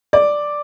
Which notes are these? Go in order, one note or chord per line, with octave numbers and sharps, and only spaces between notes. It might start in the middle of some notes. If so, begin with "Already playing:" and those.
D5